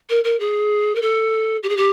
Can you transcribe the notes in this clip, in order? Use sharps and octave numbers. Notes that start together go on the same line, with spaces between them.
A#4
A#4
G#4
A#4
A4
G4
G#4
G4